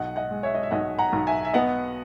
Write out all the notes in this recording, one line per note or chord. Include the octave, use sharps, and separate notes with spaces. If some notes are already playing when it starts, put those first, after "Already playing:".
Already playing: B1 D#5 F#5
D#5 F#5
G#3
C#5 E5
D#5
E5
B1 D#5 F#5
F#5 A#5
B1
E5 G#5
E5
B3 D#5 F#5